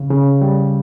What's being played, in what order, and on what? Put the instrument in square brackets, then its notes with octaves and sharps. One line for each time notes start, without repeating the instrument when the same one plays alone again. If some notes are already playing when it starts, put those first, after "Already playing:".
Already playing: [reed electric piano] C#3
C#3
G3